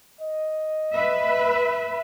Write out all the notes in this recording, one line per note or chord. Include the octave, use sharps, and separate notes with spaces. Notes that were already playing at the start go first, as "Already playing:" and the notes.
D#5
B4 E5